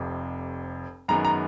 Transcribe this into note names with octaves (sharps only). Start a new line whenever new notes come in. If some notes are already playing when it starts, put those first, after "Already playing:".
Already playing: F1 F2 C3
F#2 D#3 G#3 B3 A#5
A#5